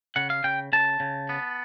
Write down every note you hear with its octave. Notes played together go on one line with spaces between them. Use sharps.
C#3 F#5
F5
C#3 G5
C#3 A5
C#3
B3